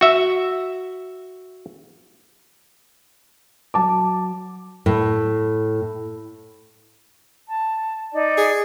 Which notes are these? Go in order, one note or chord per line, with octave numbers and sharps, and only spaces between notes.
F#4 E5
F#3 A5 D6
A2
A5
D#4 D5
G#4